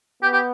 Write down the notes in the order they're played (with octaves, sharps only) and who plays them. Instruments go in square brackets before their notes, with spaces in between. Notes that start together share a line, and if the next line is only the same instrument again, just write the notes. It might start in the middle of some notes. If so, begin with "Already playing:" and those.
[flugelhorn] B3 [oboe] G4
[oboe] G4